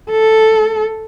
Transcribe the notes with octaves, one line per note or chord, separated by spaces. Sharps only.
A4